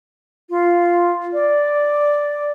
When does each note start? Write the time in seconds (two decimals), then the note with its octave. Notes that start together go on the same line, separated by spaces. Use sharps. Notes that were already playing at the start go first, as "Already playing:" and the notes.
0.50 F4
1.33 D5